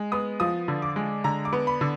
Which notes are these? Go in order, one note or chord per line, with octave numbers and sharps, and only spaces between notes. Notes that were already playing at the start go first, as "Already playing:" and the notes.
Already playing: G#3
B3 D#6
F3 D#6
D3
D6
G#3
D3 A#5
D6
B3
B5
D3